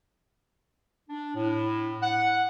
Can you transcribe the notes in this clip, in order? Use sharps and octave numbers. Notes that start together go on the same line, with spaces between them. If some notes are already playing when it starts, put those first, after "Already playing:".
D4
A2
F#5